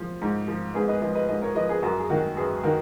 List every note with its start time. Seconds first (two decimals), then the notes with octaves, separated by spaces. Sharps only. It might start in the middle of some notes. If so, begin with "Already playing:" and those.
Already playing: F3
0.22 G#2
0.48 F3
0.74 G#2 G#4 B4
0.88 B4 D#5
1.02 F3 B4 D#5
1.15 B4 D#5
1.29 G#2 B4 D#5
1.42 A#4 C#5
1.55 F3 B4 D#5
1.69 G#4 B4
1.82 F#2 F#4 A#4
1.99 G#4
2.10 D#3 F#3 F#4 A#4
2.37 F#2 G#4 B4
2.63 D#3 F#3 F#4 A#4